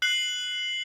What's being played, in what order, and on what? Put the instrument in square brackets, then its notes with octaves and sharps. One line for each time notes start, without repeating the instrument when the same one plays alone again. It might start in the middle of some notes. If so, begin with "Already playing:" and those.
[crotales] F#6 C7 F#7